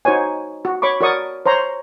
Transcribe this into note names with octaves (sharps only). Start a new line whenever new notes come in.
D#4 F#4 C5 C#5 G#5
F#4
C#5 B5 C#6 D6
F#4 A#4 C#5 D5 C#6 D#6
C5 C#5 A#5 C6